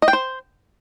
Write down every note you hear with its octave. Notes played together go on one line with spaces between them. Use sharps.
D#5
G5
C5